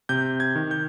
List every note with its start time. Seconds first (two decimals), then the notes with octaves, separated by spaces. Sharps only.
0.09 C3 G6
0.40 G#6
0.56 D#3
0.71 G6